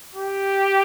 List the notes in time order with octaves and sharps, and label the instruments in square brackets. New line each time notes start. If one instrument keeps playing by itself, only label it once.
[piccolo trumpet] G4